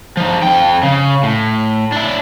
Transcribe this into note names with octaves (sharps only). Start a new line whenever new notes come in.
F3 D#4
F2 G5
C#3
A2
D4 E4